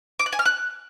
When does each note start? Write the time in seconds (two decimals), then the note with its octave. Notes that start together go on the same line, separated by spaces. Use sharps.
0.19 D6
0.26 F#6
0.32 G#5
0.39 F6
0.46 F#6